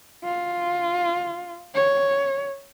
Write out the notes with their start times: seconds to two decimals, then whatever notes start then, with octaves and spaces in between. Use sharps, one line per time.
0.24 F4
1.75 C#5